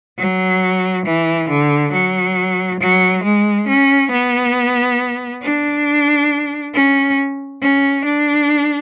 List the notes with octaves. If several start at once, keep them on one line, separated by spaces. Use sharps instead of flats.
F#3
E3
D3
F#3
F#3
G#3
C#4
B3
D4
C#4
C#4
D4